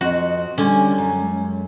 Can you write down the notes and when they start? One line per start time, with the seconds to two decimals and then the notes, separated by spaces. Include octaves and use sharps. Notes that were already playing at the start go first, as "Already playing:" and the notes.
0.01 F2 F#4 D#5
0.58 D3 G3 C#4
0.98 F#2
1.17 G#3